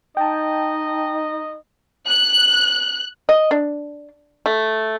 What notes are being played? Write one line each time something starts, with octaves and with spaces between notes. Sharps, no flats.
D#4 D#5 G5 A5
F#6
D#5
D4
A3